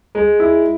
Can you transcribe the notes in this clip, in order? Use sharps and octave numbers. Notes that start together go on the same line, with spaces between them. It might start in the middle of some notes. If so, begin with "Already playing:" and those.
G#3
E4